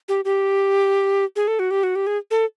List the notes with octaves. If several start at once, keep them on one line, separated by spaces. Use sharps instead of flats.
G4
G4
G#4
A4
F#4
G4
F#4
G4
G#4
A4